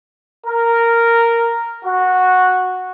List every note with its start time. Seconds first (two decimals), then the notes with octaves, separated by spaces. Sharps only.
0.47 A#4
1.85 F#4